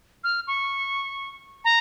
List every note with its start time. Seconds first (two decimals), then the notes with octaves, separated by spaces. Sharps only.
0.24 F6
0.47 C#6
1.65 A#5